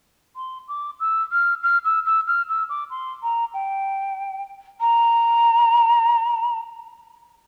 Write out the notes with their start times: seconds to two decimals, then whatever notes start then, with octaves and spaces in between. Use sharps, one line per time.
0.36 C6
0.68 D6
1.00 E6
1.32 F6
1.63 F6
1.85 E6
2.06 E6
2.28 F6
2.49 E6
2.69 D6
2.91 C6
3.23 A#5
3.54 G5
4.81 A#5